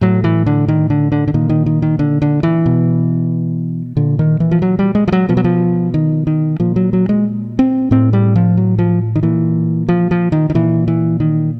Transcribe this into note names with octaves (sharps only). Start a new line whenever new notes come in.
A2 F#3
E3
D3
D#3
D3
D3
D3
A#2 D#3
D#3
D#3
D#3
D3
D3
E3
B2
A#2 D3
D#3
E3
F3
F#3
G3
G#3
F3
F#3
B2 F3
F#3
F3
D#3
D#3
A#2 F3
F#3
F#3
G#3
C4
A2 C4
G3
F3
F#3
F3
D#3
A#2 E3
F3
F3
D#3
D#3
A#2 E3
E3
D#3